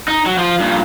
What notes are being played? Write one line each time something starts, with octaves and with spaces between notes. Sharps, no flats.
D#4
F#3
F3 F4
G2 A#2